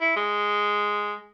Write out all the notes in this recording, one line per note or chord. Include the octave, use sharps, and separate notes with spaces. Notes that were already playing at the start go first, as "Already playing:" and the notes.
E4
G#3